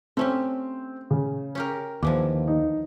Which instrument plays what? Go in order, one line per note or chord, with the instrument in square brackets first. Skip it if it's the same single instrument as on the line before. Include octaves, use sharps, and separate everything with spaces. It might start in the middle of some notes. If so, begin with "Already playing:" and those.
[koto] A3 C#4 G4 [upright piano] C4
[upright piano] C#3
[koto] C#4 G4 A#4
[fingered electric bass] D#2 [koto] D3 E3 F3 [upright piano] D6
[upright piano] D#4